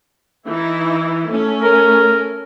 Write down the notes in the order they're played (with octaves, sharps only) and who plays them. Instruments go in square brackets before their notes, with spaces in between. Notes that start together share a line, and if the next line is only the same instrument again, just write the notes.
[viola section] E3 D#4 E4
A3 C#4
[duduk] A#4